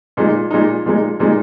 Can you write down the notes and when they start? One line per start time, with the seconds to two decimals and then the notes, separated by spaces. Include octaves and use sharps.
0.17 A#2 G#3 D#4
0.51 A#2 G#3 D#4
0.86 A#2 G#3 D#4
1.20 A#2 G#3 D#4